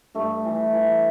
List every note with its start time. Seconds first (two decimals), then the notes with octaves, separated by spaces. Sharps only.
0.15 G2 A3
0.45 E3
0.74 E3